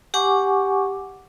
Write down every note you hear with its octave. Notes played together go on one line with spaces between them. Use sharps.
G4 F#5 G#5 C#6 D6